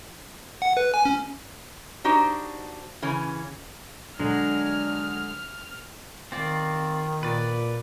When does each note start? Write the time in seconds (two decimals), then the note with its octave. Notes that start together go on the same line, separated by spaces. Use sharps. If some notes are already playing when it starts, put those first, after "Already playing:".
0.62 F#5
0.77 B4
0.94 G#5
1.05 C#4
2.04 D4 D#4 F#4 G4 C5
3.02 C#3 E3 C#4
4.20 D3 F#3 G#3 D4 F6
6.32 D#3 C4 F4 D5
7.23 A#2 B4 D5